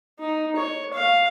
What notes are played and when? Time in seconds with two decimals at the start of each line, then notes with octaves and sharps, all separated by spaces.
0.20 D#4
0.56 C#5
0.93 F5